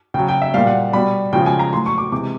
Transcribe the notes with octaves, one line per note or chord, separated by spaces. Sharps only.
C#3 F#3 G5
G5
E5
A#2 G3 F5
F#5
B2 G3 B5
C#3 F3 G#3 G5
G#5
A#5
A2 F#3 C6
C#6
D6
C3 E3 G#3 D6